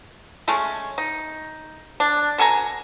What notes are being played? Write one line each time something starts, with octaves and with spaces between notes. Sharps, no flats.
G#3 A3 C#4
D#4
D4
B2 A4 G#5 A#5